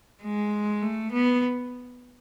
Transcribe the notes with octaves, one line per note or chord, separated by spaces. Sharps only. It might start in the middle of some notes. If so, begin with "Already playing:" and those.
G#3
A3
B3